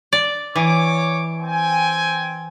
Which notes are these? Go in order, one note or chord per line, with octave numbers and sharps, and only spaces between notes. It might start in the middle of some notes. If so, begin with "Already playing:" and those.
D5
E3 C#5 D6
C4 G5 G#5